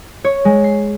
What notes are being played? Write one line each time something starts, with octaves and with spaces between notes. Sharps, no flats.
C#5
G#3
C7